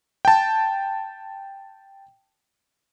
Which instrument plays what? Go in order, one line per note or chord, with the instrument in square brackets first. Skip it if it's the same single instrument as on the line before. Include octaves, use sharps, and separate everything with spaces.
[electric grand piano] G5 A5